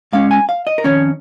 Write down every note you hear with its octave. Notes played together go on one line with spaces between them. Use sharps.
G#2 G#3 C#4 F5
G#5
F5
D#5
A#4
F2 D#3 C#4 C#5